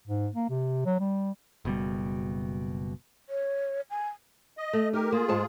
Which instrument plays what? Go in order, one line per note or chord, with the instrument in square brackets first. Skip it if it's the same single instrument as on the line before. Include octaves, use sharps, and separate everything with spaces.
[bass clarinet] G#2
A#3
C3
F#3
G3
[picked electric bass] F#1 B2 G3
[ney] C#5
G#5
[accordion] D#5
[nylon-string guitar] A3
[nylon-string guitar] D#4 [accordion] G4 A#4
[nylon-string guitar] A#3 [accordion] F4 G#4
[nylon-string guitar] G#2 A5